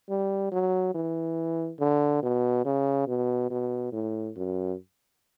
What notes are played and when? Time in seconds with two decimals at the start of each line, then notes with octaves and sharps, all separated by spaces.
0.09 G3
0.52 F#3
0.94 E3
1.79 D3
2.22 B2
2.65 C#3
3.07 B2
3.50 B2
3.92 A2
4.36 F#2